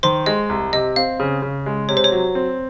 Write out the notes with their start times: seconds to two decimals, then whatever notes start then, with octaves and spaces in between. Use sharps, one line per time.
0.03 D#3 C5 C6
0.26 G#3 D#5
0.49 C2
0.73 C3 D#5
0.96 C4 F5
1.20 C#3
1.42 C#3
1.66 G#3
1.89 C3 C#5
1.97 C5
2.04 C#5
2.12 F#3
2.35 C4